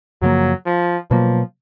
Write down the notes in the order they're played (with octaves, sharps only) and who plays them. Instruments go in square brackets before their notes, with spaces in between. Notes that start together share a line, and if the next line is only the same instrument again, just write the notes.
[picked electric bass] F#2 C#3 F3 A#3 [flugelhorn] F#3
[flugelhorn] F3
[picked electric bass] B2 F#3 A#3 [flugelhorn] F3